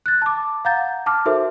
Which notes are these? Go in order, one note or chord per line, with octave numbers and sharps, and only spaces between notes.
F#6 A6
A5 D6
F5 F#5 A#5 G6 A6
A5 D6 F6
D#4 F#4 A4 A#4 C5 E5